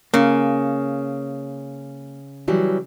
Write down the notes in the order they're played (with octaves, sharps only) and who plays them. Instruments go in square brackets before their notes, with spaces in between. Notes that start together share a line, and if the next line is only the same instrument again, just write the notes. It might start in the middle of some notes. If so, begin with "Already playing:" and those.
[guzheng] C#3 [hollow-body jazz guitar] A#3
[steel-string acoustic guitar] E3 F#3 G3